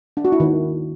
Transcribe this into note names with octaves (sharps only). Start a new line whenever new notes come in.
D4
F#4
E4
D#3